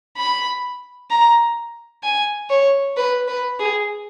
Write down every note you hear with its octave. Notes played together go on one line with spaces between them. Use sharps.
B5
A#5
G#5
C#5
B4
B4
G#4